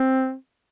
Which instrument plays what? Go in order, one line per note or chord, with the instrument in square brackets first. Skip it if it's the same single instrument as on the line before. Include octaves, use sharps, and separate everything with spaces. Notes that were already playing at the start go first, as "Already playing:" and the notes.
Already playing: [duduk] C4